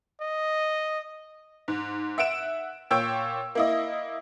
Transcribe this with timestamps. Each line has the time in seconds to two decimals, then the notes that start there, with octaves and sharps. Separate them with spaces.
0.21 D#5
1.68 G#2
2.18 E5 F#5 D7 E7
2.91 A#2 C#5 G5 E6
3.55 A#3 E4 D#5